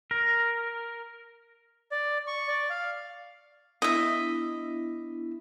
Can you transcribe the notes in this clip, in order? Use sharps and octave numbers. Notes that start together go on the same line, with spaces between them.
A#4
D5
C#6
D5
F5
B3 D4 E4 D#5 E5